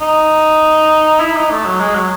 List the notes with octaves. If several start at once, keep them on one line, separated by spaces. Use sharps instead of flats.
D#4
E4
D#4
A3
F#3
G#3
F#3